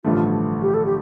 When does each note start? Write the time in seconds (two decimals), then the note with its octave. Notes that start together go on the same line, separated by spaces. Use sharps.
0.04 A1 G2 D3 F3 A3 F4
0.62 G4
0.74 A4
0.85 G4